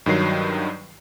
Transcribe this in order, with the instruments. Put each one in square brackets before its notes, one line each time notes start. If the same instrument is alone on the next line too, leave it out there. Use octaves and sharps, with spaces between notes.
[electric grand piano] G2 D#3 F#3 C7